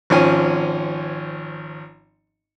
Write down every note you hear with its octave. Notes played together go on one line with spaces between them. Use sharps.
G#1 F3 C#4 G#5